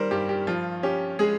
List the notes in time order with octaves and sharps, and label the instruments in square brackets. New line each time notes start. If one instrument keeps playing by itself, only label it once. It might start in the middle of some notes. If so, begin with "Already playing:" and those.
Already playing: [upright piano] D#3 G3 A#4 C5
G2 G4
G4
F3 F4
C#4 G4
G#3 G#4